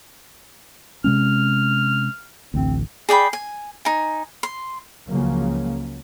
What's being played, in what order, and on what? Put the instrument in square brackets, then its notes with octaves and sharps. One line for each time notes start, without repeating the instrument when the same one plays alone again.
[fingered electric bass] C3 G#3 C#4 [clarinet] F6
[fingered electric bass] A1 D2 [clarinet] C4
[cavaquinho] G#4 D5 G5 B5
G#5
D#4 G#5
C6
[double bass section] C#2 C#3 F3 F#3 A#3